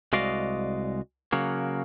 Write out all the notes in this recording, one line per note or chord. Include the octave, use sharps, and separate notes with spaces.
C2 G#3 F#4 D5 D#5 F5
C#3 F#3 A#3